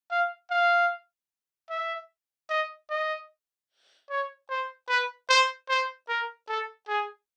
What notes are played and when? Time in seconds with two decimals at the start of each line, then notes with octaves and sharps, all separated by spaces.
0.11 F5
0.50 F5
1.70 E5
2.50 D#5
2.90 D#5
4.10 C#5
4.49 C5
4.89 B4
5.29 C5
5.69 C5
6.08 A#4
6.48 A4
6.88 G#4